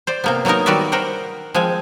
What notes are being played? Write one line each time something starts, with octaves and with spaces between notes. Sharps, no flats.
C5 D5
C3 A#3 B3
F#3 A#3 B3 D#4 A#4
D#3 G3 F#4 B4 D5 E5
A#4 C5 F#5 G5
F3 G#3 C4 G#5